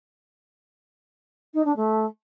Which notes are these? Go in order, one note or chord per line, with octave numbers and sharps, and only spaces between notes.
D#4
D4
A3